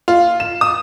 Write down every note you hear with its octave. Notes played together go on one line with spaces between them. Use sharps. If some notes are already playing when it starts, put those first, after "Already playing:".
F4
E7
D#6